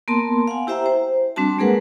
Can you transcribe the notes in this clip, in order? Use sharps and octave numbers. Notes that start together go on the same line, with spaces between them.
A#3 B3 A#4 A5 C6
F5 F#5 G#5
E4 G4 C5 E5 G5 A#5
C5
G3 C4 D4 F#4 A5
G#3 A#3 G#4 A#4 B4 F#5